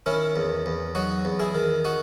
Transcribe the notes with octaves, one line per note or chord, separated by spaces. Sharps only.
D#3 C#4 E4
E2
E2
F#3 D#4 F#4
E2
E4 G#4
D#3
D#4 F#4